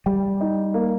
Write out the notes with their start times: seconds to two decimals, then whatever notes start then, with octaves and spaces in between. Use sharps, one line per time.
0.06 G3 G4
0.41 D#4
0.74 A#3